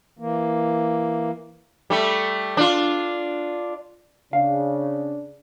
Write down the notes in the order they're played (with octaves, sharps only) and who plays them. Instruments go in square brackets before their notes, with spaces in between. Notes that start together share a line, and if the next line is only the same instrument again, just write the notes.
[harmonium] E3 A#3
[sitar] G3 A3
D4 F4
[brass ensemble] C#3 [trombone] D4 [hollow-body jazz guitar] F5